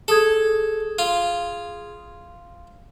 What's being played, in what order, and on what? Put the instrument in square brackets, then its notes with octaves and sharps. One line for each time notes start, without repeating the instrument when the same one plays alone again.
[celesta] G#4 D#6 G#6 [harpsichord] A4
[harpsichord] F4